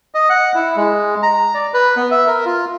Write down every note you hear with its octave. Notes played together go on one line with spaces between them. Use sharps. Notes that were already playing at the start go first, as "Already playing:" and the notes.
D#5
F#5
E4
G#3
A#5
D5
B4
B3
E5
A#4
F4